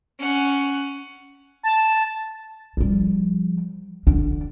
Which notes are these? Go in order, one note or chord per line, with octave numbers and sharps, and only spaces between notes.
C#4 F#5
A5
F3 G3
D3 D4